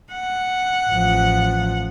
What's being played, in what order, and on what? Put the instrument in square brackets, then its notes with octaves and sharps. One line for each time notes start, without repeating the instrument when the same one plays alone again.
[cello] F#5
[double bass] A1 F3